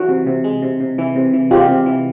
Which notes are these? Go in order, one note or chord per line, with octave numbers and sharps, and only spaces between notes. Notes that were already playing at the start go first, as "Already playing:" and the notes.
Already playing: E3 F#4
C3
C3
G#3
C3
C3
E3
C3
E3
G#3 F4 G4
C3
E3